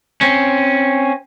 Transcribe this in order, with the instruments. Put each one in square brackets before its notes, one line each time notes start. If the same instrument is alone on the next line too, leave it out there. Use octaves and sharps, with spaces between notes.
[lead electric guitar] C4 C#4